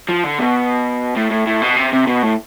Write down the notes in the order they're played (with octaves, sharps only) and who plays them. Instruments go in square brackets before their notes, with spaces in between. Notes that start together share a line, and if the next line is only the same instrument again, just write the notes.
[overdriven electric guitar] F3
D3
B2
A2
A2
A2
B2
C3
C3
B2
A2